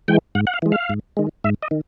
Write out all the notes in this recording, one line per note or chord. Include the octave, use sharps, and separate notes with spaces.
E3 G#3 G5
G#2 F#5
F#5
F5
E3 G#3
F5
G#2
D#3 G#3
G#2 E5
D#5
D#3